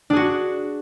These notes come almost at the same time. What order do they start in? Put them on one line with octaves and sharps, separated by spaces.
D4 G#4 F#4